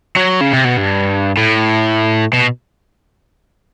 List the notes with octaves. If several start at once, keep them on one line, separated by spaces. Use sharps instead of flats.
F#3
C#3
C3
B2
G2
A2
B2